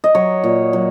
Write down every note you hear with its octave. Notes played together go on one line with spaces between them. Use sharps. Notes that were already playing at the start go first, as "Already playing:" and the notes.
D#5
F#3 C#5
A#2
F#3